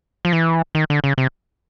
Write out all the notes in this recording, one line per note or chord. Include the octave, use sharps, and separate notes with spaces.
F3
E3
D#3
D3
C#3
C3